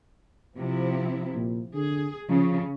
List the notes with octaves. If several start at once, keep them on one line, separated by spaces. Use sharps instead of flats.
C3 F3 E4
A#2
D3 G#4
C#3 F3